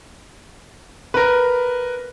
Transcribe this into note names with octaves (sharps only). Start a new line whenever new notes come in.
A#4 B4